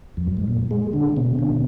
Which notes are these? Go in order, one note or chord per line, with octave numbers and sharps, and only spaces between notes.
F2
F#2
G#2
A#2
G#3
D3
B2
D3
B2